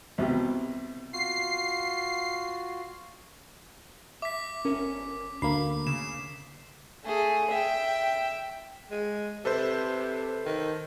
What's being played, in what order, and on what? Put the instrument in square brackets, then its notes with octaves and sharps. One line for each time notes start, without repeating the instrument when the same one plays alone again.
[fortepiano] C2 B2 G4
[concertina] F4 F#4 [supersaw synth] C7
[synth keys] E5 [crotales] D6 B6
[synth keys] G1 C#4 A#4
[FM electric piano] D2 A#3 [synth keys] B5 [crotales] C7
[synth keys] C#3 [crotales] E7
[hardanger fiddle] A3 G#4
E5 G5
[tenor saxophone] G#3
[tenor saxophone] C3 [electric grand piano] A4 B4 C5
[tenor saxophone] D#3